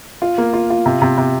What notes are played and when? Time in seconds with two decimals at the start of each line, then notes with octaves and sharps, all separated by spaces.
0.22 F4
0.38 A#3
0.53 F4
0.70 F4
0.86 C3
1.02 C3
1.18 C3